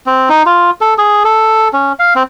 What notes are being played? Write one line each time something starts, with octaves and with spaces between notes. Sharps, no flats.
C4
D#4
F4
A4
G#4
A4
C#4
F5
C4